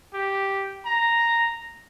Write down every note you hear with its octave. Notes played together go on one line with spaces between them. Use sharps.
G4
A#5